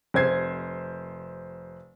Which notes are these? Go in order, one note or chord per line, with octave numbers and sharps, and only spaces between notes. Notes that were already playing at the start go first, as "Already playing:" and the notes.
F1 C5 G#6 C7